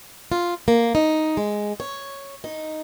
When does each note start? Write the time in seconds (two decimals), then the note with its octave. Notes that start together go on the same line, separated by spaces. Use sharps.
0.32 F4
0.68 A#3
0.95 D#4
1.37 G#3
1.80 C#5
2.44 D#4